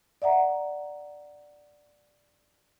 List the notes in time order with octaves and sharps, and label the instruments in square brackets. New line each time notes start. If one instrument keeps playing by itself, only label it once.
[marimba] D5 E5 F#5 A#5